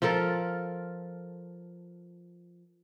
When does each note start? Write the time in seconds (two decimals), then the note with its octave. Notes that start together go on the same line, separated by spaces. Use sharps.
0.02 F3 F4 A4 A#4